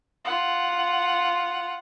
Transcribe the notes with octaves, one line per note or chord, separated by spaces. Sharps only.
F4 F#5